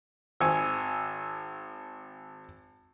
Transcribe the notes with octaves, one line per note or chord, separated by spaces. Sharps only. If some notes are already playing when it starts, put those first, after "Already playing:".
G#1 G#5